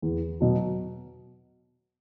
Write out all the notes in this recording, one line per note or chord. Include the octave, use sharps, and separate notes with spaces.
E2
B2 F#3